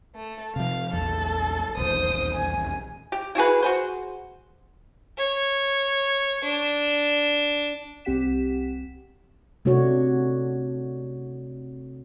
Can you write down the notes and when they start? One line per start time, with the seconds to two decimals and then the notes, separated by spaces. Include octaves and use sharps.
0.15 A3
0.56 C3 F3 F5
0.93 A#1 E2 A4
1.77 D#1 B1 E2 C5 D#6
2.34 G#5
3.12 G4
3.35 E4 F#4 G#4 B4
3.63 F#4 G#4 C5
5.18 C#5
6.44 D4
8.05 C2 C4 G4 F#5 B6 E7
9.65 C3 A3 D4 F#4 C#5